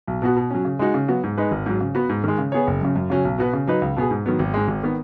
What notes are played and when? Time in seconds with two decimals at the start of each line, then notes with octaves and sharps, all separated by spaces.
0.07 B1
0.22 B2 B3 F#4
0.37 B2
0.51 F#3 C#4
0.65 C#3
0.79 G#3 D#4 F#4
0.94 C#3
1.08 F#3 B3 F#4
1.24 G#2
1.37 G#3 D#4 B4
1.51 G#1
1.66 G#2 F#3
1.81 C#3
1.95 B3 F#4 B4
2.09 G#2
2.24 D#3 G#3
2.38 C#3
2.52 B3 G#4 C#5
2.67 F#1
2.81 F#2 C#3
2.96 F#2
3.10 C#3 F#3 C#4
3.25 B1
3.38 B2 B3 F#4 B4
3.53 C#3
3.67 F#3 D#4 B4
3.82 C#2
3.96 B2 B3 G#4
4.11 G#2
4.26 D#3 F#3 B3
4.39 G#1
4.54 G#2 G#3
4.68 G#1
4.83 D#3 B3